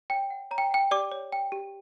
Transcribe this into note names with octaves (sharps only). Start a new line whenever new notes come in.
C#5 G5
F#5
C#5 A#5
G5
F#5 G5
G4 D5 D6
C#5
G5
G4